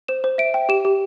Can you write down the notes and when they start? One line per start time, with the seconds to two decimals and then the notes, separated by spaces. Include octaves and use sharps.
0.08 C5 E7
0.24 C5
0.38 E5 D7
0.54 G5
0.69 G4 E7
0.85 G4